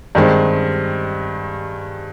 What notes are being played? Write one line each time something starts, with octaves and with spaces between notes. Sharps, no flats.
G2 D#3 G#3 C4